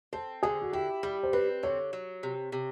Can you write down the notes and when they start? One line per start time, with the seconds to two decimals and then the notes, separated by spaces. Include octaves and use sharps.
0.13 C4 A4
0.43 D3 G#4
0.62 F#4
0.73 E4 G4
1.03 G3 G4
1.23 C5
1.33 C4 B4
1.63 D3 C#5
1.93 F#3
2.23 C3
2.52 C3